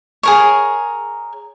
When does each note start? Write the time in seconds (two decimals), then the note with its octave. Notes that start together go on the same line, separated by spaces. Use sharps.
0.23 G#4 A#4 C#5